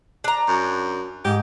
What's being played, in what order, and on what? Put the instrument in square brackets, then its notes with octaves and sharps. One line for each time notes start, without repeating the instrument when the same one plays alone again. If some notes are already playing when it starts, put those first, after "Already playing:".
[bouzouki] D4 A#5
[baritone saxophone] F#2
[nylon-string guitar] G#2 [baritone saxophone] G4